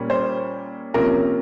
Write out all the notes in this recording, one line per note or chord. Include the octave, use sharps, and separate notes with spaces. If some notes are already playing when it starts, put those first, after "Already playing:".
Already playing: A#2 G3 A#3 C#4
C5
C3 F3 A#3 C#4 A#4